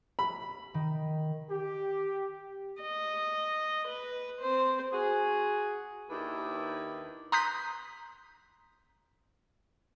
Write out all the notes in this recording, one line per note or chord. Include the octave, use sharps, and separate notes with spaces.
B5
D#3
G4
D#5
B4
C4 C5
F#4 G#4
D#2 D#3 D4 E4 B4
A#5 C6 D#6 F#6 G6 B6